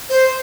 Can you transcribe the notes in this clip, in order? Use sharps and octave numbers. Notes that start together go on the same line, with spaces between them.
C5